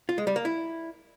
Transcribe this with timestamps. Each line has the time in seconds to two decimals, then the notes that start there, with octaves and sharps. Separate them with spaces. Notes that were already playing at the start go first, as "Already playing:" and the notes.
0.09 F4
0.18 G#3
0.27 G3
0.36 A#3
0.45 E4